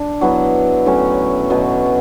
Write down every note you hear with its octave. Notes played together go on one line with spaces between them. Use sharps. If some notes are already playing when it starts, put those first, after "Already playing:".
Already playing: D4
F#3 B3 E4
A2 F#3 C#4 E4
B2 F#3 B3